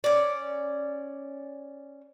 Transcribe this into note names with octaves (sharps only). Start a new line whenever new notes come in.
C#4 D5